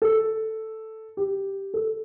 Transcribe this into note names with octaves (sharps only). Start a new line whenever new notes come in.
A4
G4
A4